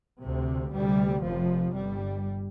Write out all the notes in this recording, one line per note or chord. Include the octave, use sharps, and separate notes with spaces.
D2 C3
D2 C3 G3
F1 F2 C3 F3
G1 G2 G3